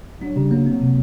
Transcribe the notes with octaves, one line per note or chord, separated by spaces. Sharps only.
F#3 D4
C#3 G3
F#3 A#3
C4
C3